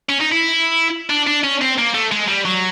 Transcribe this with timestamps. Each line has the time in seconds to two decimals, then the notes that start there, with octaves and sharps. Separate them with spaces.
0.09 C#4
0.21 D#4
0.32 E4
1.10 D4
1.27 D4
1.44 C#4
1.61 C4
1.78 A#3
1.94 A3
2.12 G#3
2.28 G3
2.45 F#3